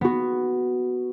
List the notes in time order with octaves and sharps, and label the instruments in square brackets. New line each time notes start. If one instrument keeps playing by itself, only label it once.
[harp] B3 F#4